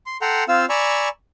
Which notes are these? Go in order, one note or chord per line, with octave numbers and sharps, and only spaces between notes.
C6
A4 F#5 G5 A#5 C6
C4 F4 F5 E6
D5 G#5 A#5 B5 C#6 E6